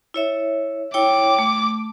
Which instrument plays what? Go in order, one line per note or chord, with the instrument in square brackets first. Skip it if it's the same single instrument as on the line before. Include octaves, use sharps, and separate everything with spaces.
[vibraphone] E4 C#5 E5
[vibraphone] E4 C#5 G5 [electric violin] D6
[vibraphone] A3